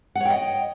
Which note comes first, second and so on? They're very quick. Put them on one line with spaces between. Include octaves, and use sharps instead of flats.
F#5 C#5 G5 D#5